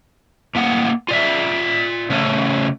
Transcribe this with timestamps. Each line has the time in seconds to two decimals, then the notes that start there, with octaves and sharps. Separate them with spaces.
0.55 A2 A#3 F#5
1.08 F4 D5 E5
2.10 C#3 A3 C#4